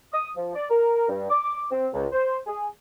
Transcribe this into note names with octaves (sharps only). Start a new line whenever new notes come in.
D#6
F3
D5
A#4
G2
D6
C4
C#2
C5
G#4